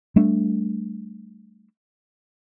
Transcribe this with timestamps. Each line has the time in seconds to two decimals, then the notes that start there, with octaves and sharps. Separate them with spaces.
0.16 G3 A3 D4